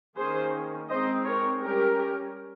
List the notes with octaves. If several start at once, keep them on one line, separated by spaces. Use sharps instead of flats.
D#3 A#3 C#4 G#4 C5
G#3 C4 D#4 C5 D#5
A#4 C#5
G3 C#4 G4 A#4